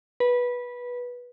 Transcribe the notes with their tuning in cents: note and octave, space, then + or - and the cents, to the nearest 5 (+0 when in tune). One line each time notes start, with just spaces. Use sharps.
B4 -15